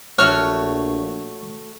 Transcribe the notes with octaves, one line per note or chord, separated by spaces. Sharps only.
A#1 A3 F#4 C#5 F6